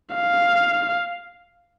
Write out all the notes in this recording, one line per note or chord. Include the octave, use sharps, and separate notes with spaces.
F5